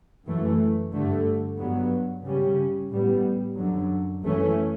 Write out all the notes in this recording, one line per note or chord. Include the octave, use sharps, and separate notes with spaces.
F#2 E3 A3
G2 D3 A3
G2 F#3 B3
C#3 G3 C#4
A2 G3 B3
F#2 D3 F#3
F#2 E3 A3 C#4